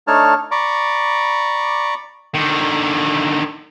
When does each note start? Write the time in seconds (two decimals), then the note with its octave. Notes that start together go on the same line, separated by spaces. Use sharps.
0.08 A3 D4 D#4 C#5 A5 F6
0.51 D5 A#5 B5 C#6 D6
2.35 D3 D#3